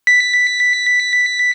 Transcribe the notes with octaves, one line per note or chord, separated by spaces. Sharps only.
B6